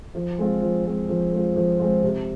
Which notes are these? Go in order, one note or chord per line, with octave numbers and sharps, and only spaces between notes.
F3
G#3 C4 F4
F3
G#3 C4 F4
F3
G#3 C4 F4
F3
G#3 C4 F4
C3